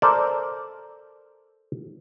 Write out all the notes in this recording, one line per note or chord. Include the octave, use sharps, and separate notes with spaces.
A4 A#4 C5 D5